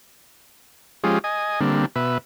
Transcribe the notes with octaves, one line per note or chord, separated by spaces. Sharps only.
F3 G#3 C#4 F4 G4 G#4
D#5 G#5
D3 G3 A#3 C4 D4
B2 B4 E5